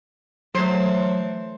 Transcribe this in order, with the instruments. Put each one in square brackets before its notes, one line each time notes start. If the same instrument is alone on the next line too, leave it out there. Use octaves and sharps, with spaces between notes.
[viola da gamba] E3 A3 [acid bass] F#3 [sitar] C5